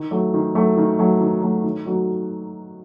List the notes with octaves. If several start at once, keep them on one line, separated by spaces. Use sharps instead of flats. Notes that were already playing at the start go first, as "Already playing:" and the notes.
Already playing: D#3
F#3 A3
D#3
F#3 A3
D#3
F#3 A3
D#3
F#3 A3
D#3
F#3 A3 D#4 F#4